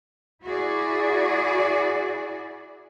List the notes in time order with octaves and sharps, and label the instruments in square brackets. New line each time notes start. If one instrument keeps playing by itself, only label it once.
[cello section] E4 F#4 G#4 D5